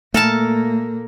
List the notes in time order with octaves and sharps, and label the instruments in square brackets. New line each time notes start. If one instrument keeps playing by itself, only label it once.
[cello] A#2 A#3 [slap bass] A3 [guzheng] A4 A#4 A5